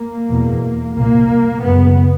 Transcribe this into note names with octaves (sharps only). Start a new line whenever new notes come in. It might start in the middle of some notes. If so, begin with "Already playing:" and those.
Already playing: A#3
E2 B2
C2 A#2 A#3
F#2 C#3 B3